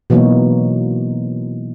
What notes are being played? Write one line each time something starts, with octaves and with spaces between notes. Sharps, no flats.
B2 E3 F#3 A#3 D#4 C#5